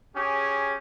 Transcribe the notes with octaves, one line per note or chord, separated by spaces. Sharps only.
C#4 G4 G#4